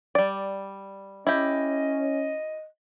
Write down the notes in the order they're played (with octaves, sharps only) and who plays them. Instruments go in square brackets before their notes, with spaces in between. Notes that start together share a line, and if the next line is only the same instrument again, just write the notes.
[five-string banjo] G3 D5
[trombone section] C#4 [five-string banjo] E4 G4 [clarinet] D#5